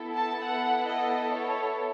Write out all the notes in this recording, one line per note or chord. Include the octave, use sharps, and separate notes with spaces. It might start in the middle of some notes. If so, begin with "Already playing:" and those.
Already playing: B3 E4 A4
A5
F#5
D#5
C#5